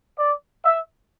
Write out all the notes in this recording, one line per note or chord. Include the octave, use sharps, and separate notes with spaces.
D5
E5